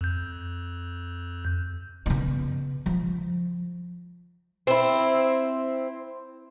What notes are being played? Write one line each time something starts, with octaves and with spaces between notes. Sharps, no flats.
F2 G6
C#3 B3
F3
C4 E4